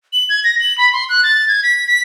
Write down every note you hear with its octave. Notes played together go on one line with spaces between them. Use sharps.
F#7
G#6
A#6
F#7
B5
C6
F#6
A6
G#6
B6
B6